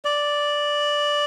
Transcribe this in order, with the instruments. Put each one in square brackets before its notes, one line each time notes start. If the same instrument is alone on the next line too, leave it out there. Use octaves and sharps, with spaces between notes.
[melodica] D5